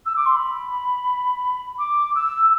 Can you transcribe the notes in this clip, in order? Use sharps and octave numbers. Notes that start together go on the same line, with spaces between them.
E6
D6
C6
B5
D6
E6